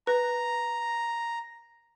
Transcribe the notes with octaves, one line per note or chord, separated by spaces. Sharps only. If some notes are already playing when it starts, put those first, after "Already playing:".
B4 A#5